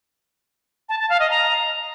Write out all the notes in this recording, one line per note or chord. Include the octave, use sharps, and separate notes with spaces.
A5
A5
F5
D#5
A#5